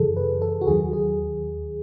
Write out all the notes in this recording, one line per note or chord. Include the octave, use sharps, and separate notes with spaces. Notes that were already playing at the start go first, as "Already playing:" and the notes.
Already playing: F#2 C#3 E3 G#4 A4
B4
A4
F#4
D#2 D#3 F#3 G#4
G#4